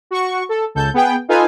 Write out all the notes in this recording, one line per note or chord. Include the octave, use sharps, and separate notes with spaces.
F#4 C#6
A4
C#2 A4 G6
B3 G#4 G5
D#4 F4 A4 B4 F5 G#5